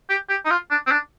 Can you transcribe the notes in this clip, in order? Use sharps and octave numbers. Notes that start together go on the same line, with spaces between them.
G4
G4
D#4
F4
D4
C4
D4